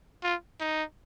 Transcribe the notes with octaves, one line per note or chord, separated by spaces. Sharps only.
F4
D#4